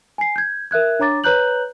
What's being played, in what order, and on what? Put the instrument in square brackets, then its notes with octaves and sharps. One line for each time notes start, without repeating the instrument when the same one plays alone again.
[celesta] G#5 C7
G6 G#6
A#4 E5 F#6 G#6
D4 C#5 A#5 D6 A6
B4 C#5 A#5 F#6 G6 F#7